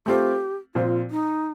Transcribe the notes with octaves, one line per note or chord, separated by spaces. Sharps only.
A3 C4 F4 G4
A#2 F3 C4 F4
D#4